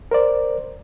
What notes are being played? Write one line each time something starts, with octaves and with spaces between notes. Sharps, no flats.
A#4 C5 D5